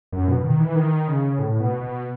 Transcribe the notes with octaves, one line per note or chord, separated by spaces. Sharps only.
F#2
B2
D#3
E3
D#3
C#3
A2
B2
B2